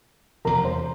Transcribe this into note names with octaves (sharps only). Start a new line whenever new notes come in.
E1 E2 C3 F3 A#4 A#5
C5 C6